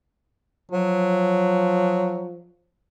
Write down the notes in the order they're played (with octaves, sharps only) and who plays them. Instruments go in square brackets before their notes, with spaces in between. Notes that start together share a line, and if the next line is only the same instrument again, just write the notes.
[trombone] F3 [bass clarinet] F#3